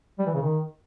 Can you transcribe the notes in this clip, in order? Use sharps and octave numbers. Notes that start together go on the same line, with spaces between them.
G3
E3
C#3
D#3